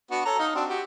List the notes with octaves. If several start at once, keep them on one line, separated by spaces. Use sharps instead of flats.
B3 D4 F#4
A4 C#5 A#5
D#4 F5
C4 D4 F#4
F#4 G4